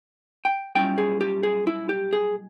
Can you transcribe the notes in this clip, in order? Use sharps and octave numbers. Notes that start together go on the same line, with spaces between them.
G5
B1 A#2 G3 C#4 E4 G5
G#4
G4
G#4
E4
G4
G#4